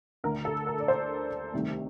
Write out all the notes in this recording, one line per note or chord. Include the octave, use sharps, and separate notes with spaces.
D2 D3 A3 A#4
A4
A#4
D5
C5
C2 C3 D#3 A3